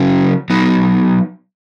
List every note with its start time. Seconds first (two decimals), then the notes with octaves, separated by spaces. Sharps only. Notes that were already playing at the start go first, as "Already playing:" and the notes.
Already playing: C#3 F#3 C#4
0.50 F#3 B3 D#4